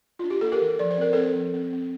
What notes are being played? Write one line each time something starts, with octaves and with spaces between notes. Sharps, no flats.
D4 F4
G4
A#3 A4
G4 A#4
E3
F3 D5
C5
C4 A#4
C4 A4 C5
F3
C4
C4